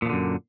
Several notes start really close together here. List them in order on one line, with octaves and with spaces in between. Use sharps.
A#2 F3 D3 F#2